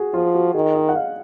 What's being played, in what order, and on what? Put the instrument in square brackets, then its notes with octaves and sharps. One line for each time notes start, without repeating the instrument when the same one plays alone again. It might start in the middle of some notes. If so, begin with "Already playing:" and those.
Already playing: [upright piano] F#4 G#4
[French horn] F3 [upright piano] F4
[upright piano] F#4
[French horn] D#3 [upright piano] G#4
[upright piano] D#5
F#5
F5